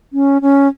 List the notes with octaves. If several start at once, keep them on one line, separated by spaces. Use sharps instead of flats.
C#4
C#4